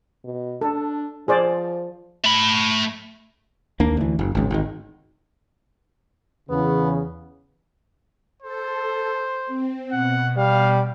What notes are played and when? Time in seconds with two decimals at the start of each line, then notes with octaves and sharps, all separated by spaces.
0.24 B2
0.61 D4 A4
1.28 F3 G#4 C5 D5
2.24 A3 B5
3.80 D#2 A#3 D4
3.97 D2 E3
4.19 F#1
4.35 G#1 C#2
4.51 G#1 D#3
6.50 E2 C#3 B3
8.42 A4 C5
9.47 C4
9.92 B2 F#5
10.37 G3 F5